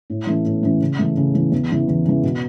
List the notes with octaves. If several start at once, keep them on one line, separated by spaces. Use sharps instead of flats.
A2
E3 A3 C#4
A2
E3 A3 C#4
C#3
E3 A3
C#3
E3 A3
E2
C#3 E3
E2
C#3 E3
B2